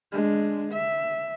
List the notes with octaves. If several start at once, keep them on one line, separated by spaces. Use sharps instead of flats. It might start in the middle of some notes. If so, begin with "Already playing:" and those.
G#3 D4
E5